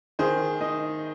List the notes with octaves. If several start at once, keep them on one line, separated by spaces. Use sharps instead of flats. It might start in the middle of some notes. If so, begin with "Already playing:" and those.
D#3 G#4 C5
D#4